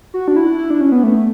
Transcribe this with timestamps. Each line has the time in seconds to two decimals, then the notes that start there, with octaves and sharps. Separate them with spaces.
0.14 F#4
0.28 D4
0.36 E4
0.59 E4
0.70 D4
0.81 C#4
0.92 B3
1.03 A3